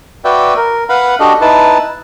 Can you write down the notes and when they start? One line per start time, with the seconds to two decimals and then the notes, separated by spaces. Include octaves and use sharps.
0.25 F#4 B4 D5 E5 G5
0.57 A#4
0.89 B4 F5 F#5 B5
1.20 D4 F#4 G4 A4 D#5
1.41 D#4 E4 B4 A5